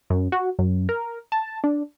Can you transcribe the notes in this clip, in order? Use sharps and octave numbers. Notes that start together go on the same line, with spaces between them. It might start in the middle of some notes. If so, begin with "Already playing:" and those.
F#2
F#4
F#2
A#4
A5
D4